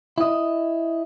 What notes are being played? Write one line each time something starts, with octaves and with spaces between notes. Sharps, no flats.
E4 D#5